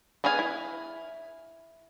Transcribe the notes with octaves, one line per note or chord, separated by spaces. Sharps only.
B3 G#4 B4 F5 G#5
E4